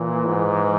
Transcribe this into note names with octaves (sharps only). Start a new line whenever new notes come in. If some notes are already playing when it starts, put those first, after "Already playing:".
Already playing: A#2 E3
G#2